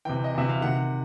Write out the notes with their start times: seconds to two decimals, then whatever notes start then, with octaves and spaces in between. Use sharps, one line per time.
0.05 C3 E3 G5
0.24 D#5
0.34 C3 E3 E5
0.49 F5
0.61 C3 D#3 F#5